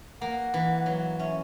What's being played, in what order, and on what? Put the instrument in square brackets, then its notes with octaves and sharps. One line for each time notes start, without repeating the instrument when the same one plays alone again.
[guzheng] A#3 [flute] F#5
[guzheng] E3
[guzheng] F#3 [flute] F#5
[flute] F#5
[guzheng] C#4 [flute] E5